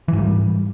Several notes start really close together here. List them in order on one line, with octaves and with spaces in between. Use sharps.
E3 G#2 G3